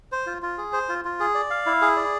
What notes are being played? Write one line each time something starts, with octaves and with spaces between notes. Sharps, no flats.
C5
F4
F4
G#4
C5
F4
F4
G#4
D5
F5
E4
G#4
D5